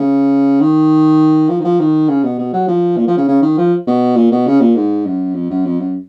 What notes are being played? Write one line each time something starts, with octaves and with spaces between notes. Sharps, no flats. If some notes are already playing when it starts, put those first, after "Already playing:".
Already playing: C#3
D#3
F3
D#3
F3
D#3
C#3
B2
B2
F#3
F3
A#2
F3
C#3
C#3
D#3
F3
B2
A#2
B2
C#3
A#2
G#2
F#2
F2
F#2
F2
F#2